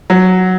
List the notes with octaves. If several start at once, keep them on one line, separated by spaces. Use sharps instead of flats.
F#3